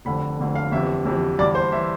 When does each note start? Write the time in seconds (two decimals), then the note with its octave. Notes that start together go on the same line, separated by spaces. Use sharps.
0.05 F1 F2 D3 B5
0.39 F1 F2 D3
0.55 F5
0.72 G1 F2 C3 E3 E5
1.05 G1 F2 C3 E3
1.38 G1 G2 E3 D5
1.55 C5
1.72 E3 E5